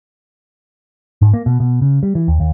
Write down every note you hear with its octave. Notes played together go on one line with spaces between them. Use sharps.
G#2
A#3
B2
B2
C#3
G3
E3
D#2
D#2